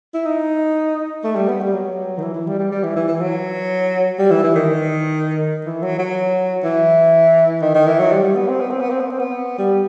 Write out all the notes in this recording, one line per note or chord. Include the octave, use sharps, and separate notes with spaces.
E4
D#4
A3
G3
B3
G3
F#3
D#3
E3
E3
G3
G3
G3
E3
E3
E3
F#3
G3
E3
E3
D#3
E3
F#3
F#3
E3
D#3
D#3
E3
F#3
G3
G3
B3
C4
B3
C4
B3
C4
B3
C4
B3
G3